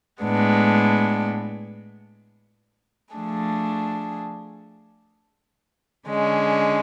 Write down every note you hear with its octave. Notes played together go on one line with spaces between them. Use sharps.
A2 G#3 B3 D4
F3 A3 D4 G#4
D3 G#3 C#4